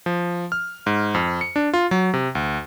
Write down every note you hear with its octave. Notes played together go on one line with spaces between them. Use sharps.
F3
F6
G#2
F2
C#7
D4
F4
F#3
C3
D2